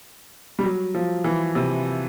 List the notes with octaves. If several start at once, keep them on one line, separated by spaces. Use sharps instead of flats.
G3
F#3
F3
E3
C3